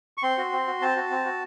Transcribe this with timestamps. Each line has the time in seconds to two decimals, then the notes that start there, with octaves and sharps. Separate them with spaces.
0.18 C#6
0.23 C4 C6
0.38 F#4
0.52 C4
0.67 F#4
0.81 C4 A5
0.96 F#4
1.11 C4
1.25 F#4